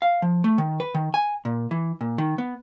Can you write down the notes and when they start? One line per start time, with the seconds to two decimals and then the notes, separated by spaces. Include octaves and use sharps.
0.02 F5
0.22 F3
0.44 A3
0.58 D#3
0.80 B4
0.95 D#3
1.14 G#5
1.45 A#2
1.71 E3
2.01 A#2
2.18 D#3
2.38 B3